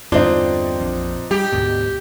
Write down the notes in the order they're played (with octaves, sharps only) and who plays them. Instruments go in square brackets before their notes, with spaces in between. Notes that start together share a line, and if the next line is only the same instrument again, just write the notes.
[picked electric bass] E2 G2 D3 [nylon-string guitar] C4 F4 [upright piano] D4 D#4
[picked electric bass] A#1 F2
[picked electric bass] G3 [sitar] G4
[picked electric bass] D2 G#2 B2